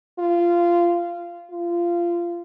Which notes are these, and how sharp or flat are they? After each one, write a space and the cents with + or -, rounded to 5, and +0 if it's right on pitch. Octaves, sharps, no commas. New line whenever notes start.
F4 -15
F4 -20